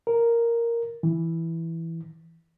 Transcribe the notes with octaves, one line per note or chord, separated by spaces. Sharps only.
A#4
E3